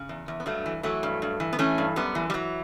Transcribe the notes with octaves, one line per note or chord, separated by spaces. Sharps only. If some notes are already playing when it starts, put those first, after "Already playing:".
Already playing: C#3
E2
E2
B3
G2 F#3 A3
E3
E3 F#3 A3
G2
G2
E3
B3
E3 A3 C#4
G2
F#2 G3 B3
E3
G3
E3 F#3